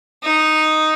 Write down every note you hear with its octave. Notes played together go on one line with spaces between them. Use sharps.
D#4